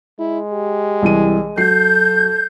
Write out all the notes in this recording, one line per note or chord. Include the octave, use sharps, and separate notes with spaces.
G#3 E4
G4
C2 E3 D#7
F#3 A4 G6 C7